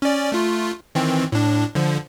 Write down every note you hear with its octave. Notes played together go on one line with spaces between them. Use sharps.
C#4 D5
A3 F4
D#3 E3 C4
A2 D4
D3 F3